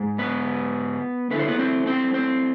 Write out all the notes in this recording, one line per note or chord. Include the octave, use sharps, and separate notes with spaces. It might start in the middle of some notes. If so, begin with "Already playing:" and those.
Already playing: G#2 G#3
B3 B4
D3 A3 E4 B4
C5
B3 B4
C4 C5
C4 C5
C4 C5